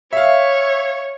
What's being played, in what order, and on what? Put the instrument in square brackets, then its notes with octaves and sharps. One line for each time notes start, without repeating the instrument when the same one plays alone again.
[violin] C#5 [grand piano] E5 F5